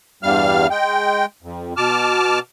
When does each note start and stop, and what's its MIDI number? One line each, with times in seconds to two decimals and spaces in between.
0.23 0.67 40
0.23 0.67 43
0.23 0.67 55
0.23 0.67 77
0.23 0.67 89
0.70 1.25 56
0.70 1.25 79
1.42 1.74 41
1.77 2.39 47
1.77 2.39 81
1.77 2.39 86
1.77 2.39 89